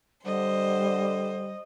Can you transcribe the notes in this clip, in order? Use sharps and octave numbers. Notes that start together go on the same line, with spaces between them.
D3 G3 C5 D#5